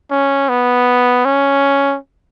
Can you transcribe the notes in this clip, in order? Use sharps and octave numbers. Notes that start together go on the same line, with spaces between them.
C#4
B3
C#4